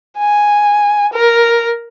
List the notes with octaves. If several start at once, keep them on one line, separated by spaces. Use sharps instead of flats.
G#5
A#4